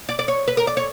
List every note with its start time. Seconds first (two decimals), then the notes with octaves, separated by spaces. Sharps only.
0.09 D5
0.19 D5
0.28 C#5
0.48 B4
0.57 A#4
0.67 D5
0.77 C#5